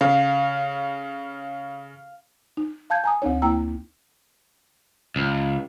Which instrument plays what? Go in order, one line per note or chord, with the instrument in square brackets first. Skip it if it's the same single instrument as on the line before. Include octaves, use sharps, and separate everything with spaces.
[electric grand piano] C#3 [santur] F5
[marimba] D#4
F5 A5 G6 G#6
G#5 A#5 D#6
D2 C4 D#4 C#5
A#3 E4 G5 A#5 E6
[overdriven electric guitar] C#2